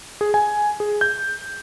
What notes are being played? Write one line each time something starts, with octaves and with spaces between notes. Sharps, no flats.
G#4
G#5
G#4
G6